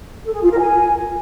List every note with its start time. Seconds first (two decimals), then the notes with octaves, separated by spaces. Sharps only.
0.25 A4
0.33 G#4
0.42 F4
0.51 A#4
0.60 G#5